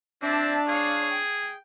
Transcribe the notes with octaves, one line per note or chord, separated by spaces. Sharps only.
C4 D4 E5 A5
G#4 C#5 F5
G5